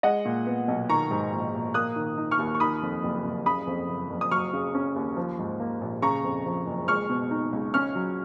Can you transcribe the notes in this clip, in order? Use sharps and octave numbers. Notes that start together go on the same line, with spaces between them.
G#3 D#5 F#5
A#2
B3
B1
D#3 A#5 C#6
G#2
A#1
A#1
A#3 D#6 F#6
D#3
D#4
C#6 F6
D#2
C#6
D#3 B5 D#6
F2
F#1
F#1
C#3 B5 D#6
F2
F#1
F#1
D#6
F#3 C#6 F6
C#3
C#4
D#2
F3
G#2
A#3
A#1
C#3 A#5 C#6
F2
F3
F#1
G#3 C#6 F6
B2
D#4
C#2
C#4 C#6 F6
F#3